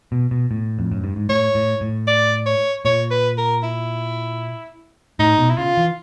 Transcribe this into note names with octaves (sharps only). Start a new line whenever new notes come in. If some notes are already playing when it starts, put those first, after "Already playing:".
B2
B2
A2
F2
F#2
G2
G#2
A2 C#5
A2
A2
D5
C#5
A#2 C#5
B4
A#4
E4
A2 D#4
B2
E4
C#3 F4
E3